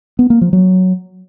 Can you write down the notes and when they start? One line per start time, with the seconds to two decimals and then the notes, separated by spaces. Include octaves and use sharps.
0.19 B3
0.30 A#3
0.41 F3
0.53 F#3